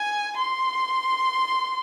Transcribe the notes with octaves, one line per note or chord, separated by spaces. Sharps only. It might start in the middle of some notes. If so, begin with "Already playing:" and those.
Already playing: G#5
C6